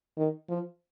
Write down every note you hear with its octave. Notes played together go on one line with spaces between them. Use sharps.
D#3
F3